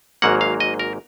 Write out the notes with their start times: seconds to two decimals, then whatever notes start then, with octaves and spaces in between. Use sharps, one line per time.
0.22 G#1 G#2 F#3 A#3 F#5
0.41 F5
0.60 D#5
0.80 A#4